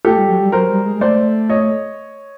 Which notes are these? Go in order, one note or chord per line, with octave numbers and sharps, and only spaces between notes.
A3 G4 A4
G3
F#3
G3
F#3 A#4 C5
G3
G#3
G#3
A3 C5 D5
C#5 D#5